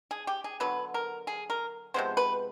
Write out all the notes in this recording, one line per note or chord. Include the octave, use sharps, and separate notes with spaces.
G#4
G4
G#4
D3 F#3 B3 B4
A#4
G#4
A#4
C3 F3 G#3 B3 C5
B4